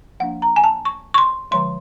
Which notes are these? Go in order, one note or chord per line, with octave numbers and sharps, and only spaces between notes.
F3 A#3 D4 F#5
A#5
G#5
A5
C#6
C#6
C6
D3 F3 G#3 C6